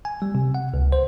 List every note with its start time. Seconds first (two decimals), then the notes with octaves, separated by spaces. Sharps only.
0.05 G#5
0.22 G3
0.35 C3
0.54 F#5
0.74 C#2
0.92 C5